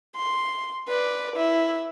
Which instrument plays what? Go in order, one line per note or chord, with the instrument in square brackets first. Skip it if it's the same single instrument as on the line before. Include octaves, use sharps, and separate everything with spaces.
[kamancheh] C6
B4 D5
E4